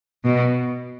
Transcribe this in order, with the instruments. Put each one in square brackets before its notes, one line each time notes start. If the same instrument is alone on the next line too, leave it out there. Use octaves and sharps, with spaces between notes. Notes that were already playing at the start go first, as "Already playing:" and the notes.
[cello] B2